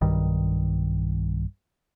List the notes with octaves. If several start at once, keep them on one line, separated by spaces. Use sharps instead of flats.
B1 G2 D#3 G3